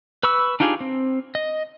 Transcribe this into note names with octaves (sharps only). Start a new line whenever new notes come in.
B4 B5 C#6 E6
D4 D#4 F4 G4 G#4
C4
D#5